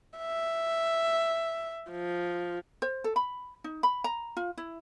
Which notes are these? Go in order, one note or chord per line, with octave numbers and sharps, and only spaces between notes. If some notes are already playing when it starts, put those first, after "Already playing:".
E5
F3
C5
A4
B5
D#4
B5
A#5
F4
E4